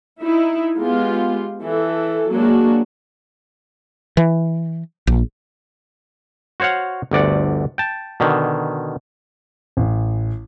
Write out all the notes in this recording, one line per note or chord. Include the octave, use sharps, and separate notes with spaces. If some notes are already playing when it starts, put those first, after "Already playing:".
D#4 E4
G#3 B3 F4 G4
E3 A4
F#3 G#3 A#3 D4 F#4
E3
A#1
F#4 C5 C#5 F5 F#5
G1 D2 D5 F#5
G5 A5
B2 D3 D#3
A1